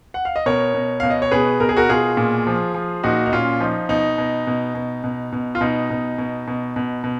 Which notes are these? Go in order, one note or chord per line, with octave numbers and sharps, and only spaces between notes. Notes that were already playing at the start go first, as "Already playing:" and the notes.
F#5
F5
D#5
B2 A#4 C#5
B2
B2 F5
D#5
C#5
B2 G#4 B4
B2 A#4
G#4
F#4 A#4
B2 F4 G#4
A#2
F3
F3
A#2 D#4 F#4
D#4
A#2 C#4 F4
F3 D#4
B2 D#4
B2
B2
B2
B2
B2
F4
B2 D#4
B2
B2
B2
B2
B2